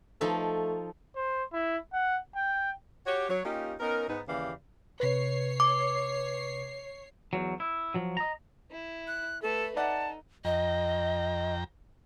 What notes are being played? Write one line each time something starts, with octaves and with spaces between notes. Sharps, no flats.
F3 A3 D#4 A4
C5
E4
F#5
G5
F#4 G4 C#5
F#3 C#5
A#3 C#4 D#4 F4 G4
B3 C#4 D#4 A#4
G#2 B3 D#4
D#2 C#3 E3 G4 D5 F5
C3 B4 C#5 C7
D6
E2 F#3
E4
F3 F#3
D#5 A#5
E4
F#6
A3 A4 B4
D#4 D5 E5 F#5 A5
F2 D#5 G5 A#5